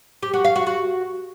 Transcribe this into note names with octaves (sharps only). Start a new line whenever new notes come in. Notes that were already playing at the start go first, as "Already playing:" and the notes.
G4
F#4
F5
F#4
F#4